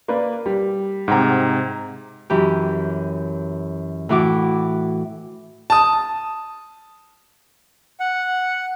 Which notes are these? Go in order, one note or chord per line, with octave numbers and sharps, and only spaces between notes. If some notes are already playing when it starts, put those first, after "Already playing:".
A#3 B4 D5
G3
G#2 C3 F#5 G5 A#5
F#2 E3 G4
A2 E3 F#4 D6
A5 D#6
F#5